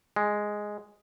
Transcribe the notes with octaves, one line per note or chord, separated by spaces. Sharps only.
G#3